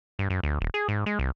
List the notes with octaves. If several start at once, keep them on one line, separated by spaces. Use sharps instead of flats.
G2
F#2
D2
D#1
G#4
G#2
G#3
C2